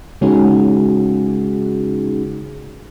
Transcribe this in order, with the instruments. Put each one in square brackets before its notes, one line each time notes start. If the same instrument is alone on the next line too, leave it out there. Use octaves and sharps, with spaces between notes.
[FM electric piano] C#3 G#3 C#4 D#4 F#4 G#4